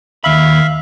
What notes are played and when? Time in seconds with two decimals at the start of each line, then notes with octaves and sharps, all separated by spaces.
0.24 D#2 E5 F5 B5